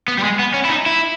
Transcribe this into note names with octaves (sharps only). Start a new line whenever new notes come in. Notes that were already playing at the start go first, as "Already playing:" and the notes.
B3
G3
G#3
B3
C#4
E4
D#4
E4